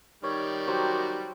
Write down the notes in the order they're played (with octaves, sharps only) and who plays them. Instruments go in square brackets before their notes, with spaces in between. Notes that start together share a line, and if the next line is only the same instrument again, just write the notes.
[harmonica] D#3 G3 [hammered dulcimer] C#5
[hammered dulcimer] F#3 G4 C5 [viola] F#4